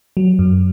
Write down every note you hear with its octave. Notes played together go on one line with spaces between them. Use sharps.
F#3
F#2